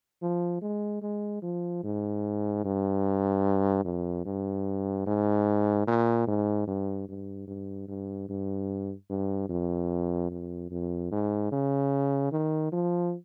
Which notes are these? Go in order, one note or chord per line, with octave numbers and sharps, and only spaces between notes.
F3
G#3
G#3
F3
G#2
G2
F2
G2
G#2
A#2
G#2
G2
G2
G2
G2
G2
G2
F2
F2
F2
G#2
C#3
D#3
F3